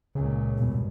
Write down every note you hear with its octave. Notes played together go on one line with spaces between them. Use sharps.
C#2 A#2 C#3
E2 G2 B2